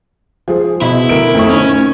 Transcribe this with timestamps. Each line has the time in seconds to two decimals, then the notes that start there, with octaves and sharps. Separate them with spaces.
0.48 F3 G#4
0.82 B2 E4
1.09 D2 A#4 D7
1.35 F2 A3 C#6
1.50 D#3 C#4